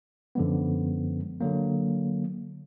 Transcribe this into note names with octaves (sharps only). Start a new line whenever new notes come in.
F#2 D3 F3 G#3 B3
D3 F#3 A#3